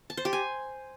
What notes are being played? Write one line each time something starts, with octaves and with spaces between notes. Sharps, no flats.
A5
C5
G4
G#5